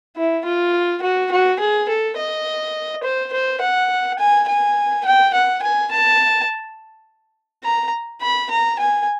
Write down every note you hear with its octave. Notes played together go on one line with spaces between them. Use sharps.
E4
F4
F#4
F#4
G#4
A4
D#5
C5
C5
F#5
G#5
G#5
G5
F#5
G#5
A5
A#5
B5
A#5
G#5